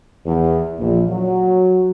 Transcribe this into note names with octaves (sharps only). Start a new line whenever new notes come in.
E2
A#1
F#3